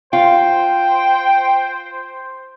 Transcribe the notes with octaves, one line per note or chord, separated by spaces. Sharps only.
F4 C5 G5